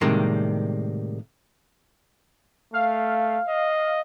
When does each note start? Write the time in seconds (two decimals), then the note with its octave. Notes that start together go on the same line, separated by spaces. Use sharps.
0.01 A2 C3 D#3 G3 G#3 A#3
2.73 A3 F5
3.48 D#5